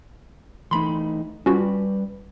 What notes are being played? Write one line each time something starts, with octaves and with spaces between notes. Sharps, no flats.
E3 A3 D#4 B5 C6
G3 C#4 F4 F#4 B4